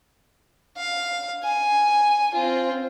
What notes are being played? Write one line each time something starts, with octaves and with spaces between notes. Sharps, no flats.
F5
G#5
C4 F4